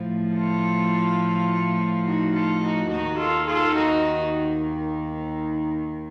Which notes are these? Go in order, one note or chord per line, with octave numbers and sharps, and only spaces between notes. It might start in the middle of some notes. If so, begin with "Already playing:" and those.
Already playing: A2 F3
F4 A4
D#4 F#4
F4 A4
D#4 F#4
D#2 D#3 D#4 F#4
F4 A4
F4 A4
D#4 F#4